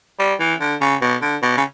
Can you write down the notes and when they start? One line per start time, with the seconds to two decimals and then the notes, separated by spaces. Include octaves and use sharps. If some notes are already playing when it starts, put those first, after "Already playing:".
0.19 G3
0.40 E3
0.60 D3
0.81 C#3
1.01 B2
1.21 D3
1.42 B2
1.57 C#3